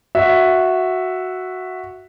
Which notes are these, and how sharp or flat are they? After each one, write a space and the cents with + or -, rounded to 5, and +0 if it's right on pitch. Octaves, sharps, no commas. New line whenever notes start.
F#4 -5 E5 +0